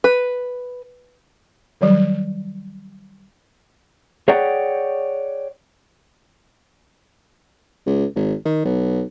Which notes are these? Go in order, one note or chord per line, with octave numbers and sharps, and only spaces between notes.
B4
D#3 F#3 G3
G#4 C#5 D5 F#5 G5
C#2
G#1
D#3
B1